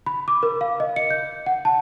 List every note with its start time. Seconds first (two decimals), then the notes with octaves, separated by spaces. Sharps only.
0.06 B5
0.28 D6
0.43 A#4
0.61 F5
0.80 D#5
0.96 C#7
1.10 G6
1.46 F#5
1.65 A5